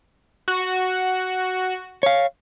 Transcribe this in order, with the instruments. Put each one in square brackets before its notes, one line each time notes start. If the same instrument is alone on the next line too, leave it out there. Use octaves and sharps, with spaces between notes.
[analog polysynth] F#4
[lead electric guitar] C#5 F5